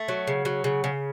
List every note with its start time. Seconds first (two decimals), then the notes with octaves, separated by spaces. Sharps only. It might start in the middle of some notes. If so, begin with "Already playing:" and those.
Already playing: A3
0.08 F#3
0.27 C#3
0.45 F#3
0.64 C#3
0.84 C#3